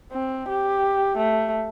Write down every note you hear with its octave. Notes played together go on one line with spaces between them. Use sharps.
C4
G4
A3